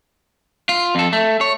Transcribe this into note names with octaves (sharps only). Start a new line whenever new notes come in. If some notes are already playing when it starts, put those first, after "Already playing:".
F4
F2 A4
A3
C#5